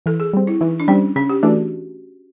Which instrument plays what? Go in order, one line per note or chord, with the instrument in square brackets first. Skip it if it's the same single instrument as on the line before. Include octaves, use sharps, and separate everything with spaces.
[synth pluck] E3 [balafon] A4
[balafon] G#4
[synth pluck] G3 C4
[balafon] E4
[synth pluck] E3 [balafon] D#4
[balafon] D4
[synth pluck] G3 C4 [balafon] C#4
[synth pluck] C#3 [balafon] C#4
[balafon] G4
[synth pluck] E3 A3 D4 [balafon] F#4